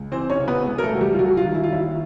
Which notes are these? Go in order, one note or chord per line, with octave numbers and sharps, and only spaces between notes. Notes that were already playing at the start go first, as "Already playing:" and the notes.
Already playing: C#2
E3 C4 C5
C#4 C#5
C#3
B3 B4
C#2
A#4
A3 A4
C#2 F#4
G3 G4
F4
F#3 G3 F#4
F4
D#3
E4
F4
D#2 E4